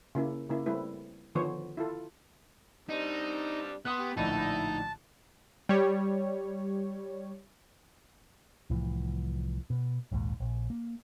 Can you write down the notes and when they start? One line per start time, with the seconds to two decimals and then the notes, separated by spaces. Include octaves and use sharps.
0.15 C#3 A#3 E4
0.49 C#3 A#3 E4
0.66 G3 A3 C4 E4 B4
1.35 D3 D#3 F3 B3 C5 C#5
1.77 E4 F4 A4
2.89 G3 C4 D4 D#4
3.85 B3 C6 D#6 F#6
3.99 G4
4.17 A#1 A2 D3 D#4 E4 A5
5.69 G3 C#5
8.70 C2 A2 E3 F3
9.70 B2
10.12 A#1 D#2 G#2
10.40 A#1
10.70 A#3